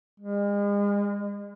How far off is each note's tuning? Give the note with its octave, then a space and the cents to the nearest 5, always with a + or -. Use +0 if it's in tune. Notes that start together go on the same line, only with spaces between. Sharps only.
G#3 -40